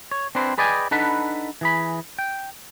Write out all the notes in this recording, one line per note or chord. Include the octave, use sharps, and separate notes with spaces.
C#5
C4 D4 E4 B4 C5
G#4 B4 D5 D#5 G5 G#5
D4 D#4 A4 B4 F#5 B5
E3 G#4 B5
G5